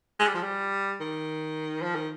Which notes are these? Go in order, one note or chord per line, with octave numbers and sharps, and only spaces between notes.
G#3
G3
F3
G3
D#3
F3
D#3